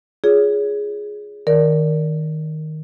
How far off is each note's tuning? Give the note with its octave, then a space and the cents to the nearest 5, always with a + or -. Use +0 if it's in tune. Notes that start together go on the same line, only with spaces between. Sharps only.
F4 -5 G#4 +0 C#5 +30
D#3 +0 A#4 +0 D5 -20